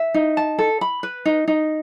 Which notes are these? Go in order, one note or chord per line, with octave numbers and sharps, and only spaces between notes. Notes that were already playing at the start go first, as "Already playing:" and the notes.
Already playing: E5
D#4
A5
A4
B5
B4
D#4
D#4